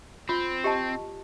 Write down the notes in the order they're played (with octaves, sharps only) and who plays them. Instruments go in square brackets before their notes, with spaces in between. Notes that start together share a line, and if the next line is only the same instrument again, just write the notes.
[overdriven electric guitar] C4 [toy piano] F4
[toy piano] G4 D#5 A5